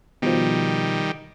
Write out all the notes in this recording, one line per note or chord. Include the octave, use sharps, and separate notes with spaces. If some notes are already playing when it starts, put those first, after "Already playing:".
B2 D#3 F3 G3